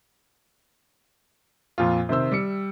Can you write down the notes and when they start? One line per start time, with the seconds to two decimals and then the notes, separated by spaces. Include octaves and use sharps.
1.78 F2 A#2 F4
2.09 C3 D#3 C5 E6
2.31 G3 C#7